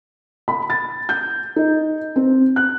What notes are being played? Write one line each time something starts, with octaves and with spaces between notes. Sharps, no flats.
B5
A6
G6
D#4
C4
F#6